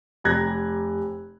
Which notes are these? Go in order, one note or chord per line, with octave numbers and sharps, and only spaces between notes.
F1 G4 A#5 F#6 G#6 A#6